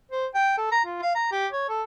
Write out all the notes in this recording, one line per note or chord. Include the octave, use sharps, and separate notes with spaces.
C5
G5
A4
A#5
F4
F5
A#5
G4
C#5
A4